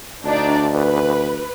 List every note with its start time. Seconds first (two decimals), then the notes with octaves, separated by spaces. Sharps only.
0.24 D2 D4 D#4 D5
0.76 B4